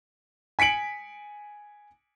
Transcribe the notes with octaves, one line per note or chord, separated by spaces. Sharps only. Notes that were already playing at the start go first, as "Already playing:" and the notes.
G#5 B6 C#7 D7 F#7